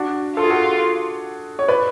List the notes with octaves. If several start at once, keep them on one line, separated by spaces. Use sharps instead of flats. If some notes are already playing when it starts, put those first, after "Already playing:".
Already playing: D4 F#4
F4 A4
G#4
F#4 A4
C#5
B4 D5